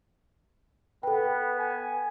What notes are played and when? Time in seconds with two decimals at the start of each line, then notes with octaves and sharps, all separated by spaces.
1.03 B3 A4 B4 G5
1.59 G#5